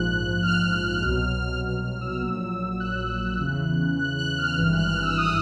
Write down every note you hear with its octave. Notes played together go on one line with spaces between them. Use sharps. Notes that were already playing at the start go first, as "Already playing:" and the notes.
Already playing: A#1 G#2 F3 F#6
F6
C2 B2 F#3
F6
F6
E6
A#1 A#2 F#3
F#6
E2 C#3 E3
F#6
F#6
F6
G#1 G2 E3 F6
F#6
F6
E6
D#6